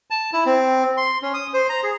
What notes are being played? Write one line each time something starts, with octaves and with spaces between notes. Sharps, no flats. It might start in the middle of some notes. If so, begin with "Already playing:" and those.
A5
E4
C4
C6
C#4
D#6
C5
A#5
G#4